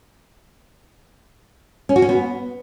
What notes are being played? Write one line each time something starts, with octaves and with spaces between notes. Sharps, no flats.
C#4
F#4
C#4
B3